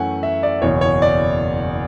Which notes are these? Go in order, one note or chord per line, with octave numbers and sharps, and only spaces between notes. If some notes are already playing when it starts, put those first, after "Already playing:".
Already playing: F#2 E3 A3 C#4 F#5 G#5
E5
D5
F#1 E2 B2 C#5
C#5
D5